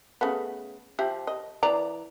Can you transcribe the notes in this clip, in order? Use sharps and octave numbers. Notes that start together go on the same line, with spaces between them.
C#3 A3 B3
F3 G4 E5
D#5
E3 D5 A#5